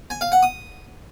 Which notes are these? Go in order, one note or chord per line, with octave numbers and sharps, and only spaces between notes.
G#5
F5
F#5
D#6